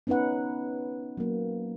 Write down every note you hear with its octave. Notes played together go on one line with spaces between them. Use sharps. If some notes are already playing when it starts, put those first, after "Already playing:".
B3 C#4 D#4 B4 F#5
F#3 A#3